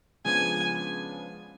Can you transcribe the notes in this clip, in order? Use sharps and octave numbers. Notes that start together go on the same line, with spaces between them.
C#3 F3 G#3 B3 D4 G#5